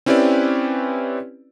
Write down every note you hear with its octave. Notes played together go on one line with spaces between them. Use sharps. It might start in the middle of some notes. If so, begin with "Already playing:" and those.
C4 C#4 E4 G4 B4 D5